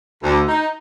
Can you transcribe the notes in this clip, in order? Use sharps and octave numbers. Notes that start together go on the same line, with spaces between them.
D2
D#4